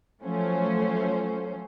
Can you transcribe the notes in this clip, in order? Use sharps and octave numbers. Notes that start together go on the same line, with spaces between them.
F3 F#3 A3 C#4 C5